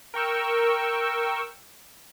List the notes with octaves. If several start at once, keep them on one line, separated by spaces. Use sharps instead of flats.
A#4 G5 C#6 E6